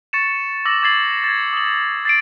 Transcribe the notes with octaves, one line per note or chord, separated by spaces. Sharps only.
C#6 A6 C#7 E7
D6 E6 A#6 F#7
D6 G#6 A6 C7 F#7
G#6 A6
D#6 F#7
A6 C7 D7